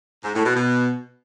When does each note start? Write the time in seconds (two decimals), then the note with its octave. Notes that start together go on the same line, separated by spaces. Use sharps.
0.24 G#2
0.34 A2
0.45 B2
0.56 B2